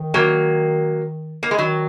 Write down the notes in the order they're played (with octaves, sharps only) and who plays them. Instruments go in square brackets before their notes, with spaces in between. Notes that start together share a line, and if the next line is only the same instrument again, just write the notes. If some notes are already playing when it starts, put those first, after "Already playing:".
Already playing: [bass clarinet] D#3
[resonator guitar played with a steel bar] F#3 A#3
A#3
G#3
[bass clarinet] D#3 [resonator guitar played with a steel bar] F#3